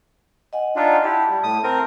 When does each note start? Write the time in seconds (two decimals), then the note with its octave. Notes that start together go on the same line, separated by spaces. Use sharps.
0.53 D#5 F#5 G#5
0.76 D4 D#4 F4
1.04 E4 G4 E5 A5
1.30 G3
1.43 A2 D#6
1.64 C4 A#4